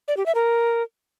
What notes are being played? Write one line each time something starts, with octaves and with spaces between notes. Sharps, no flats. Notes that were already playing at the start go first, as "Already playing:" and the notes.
D5
G4
E5
A#4